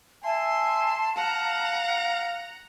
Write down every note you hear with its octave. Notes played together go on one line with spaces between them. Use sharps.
E5 G#5 A5 C6
F5 F#5 A#5